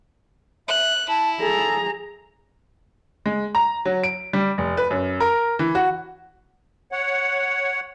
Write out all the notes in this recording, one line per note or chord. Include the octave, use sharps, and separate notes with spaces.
E5 F#6
E4 A5
G#4 A4 A#5
G#3
A#5
F#3
D7
G3
F1
B4
F#2
A#4
E3
F#4
C#5 F#5